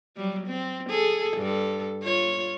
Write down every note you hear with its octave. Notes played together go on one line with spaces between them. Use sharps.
F#3 G3
C4
G#4 A4
G2 A4
F4 C#5